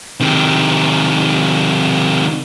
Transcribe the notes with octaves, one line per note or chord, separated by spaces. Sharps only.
C3 D#3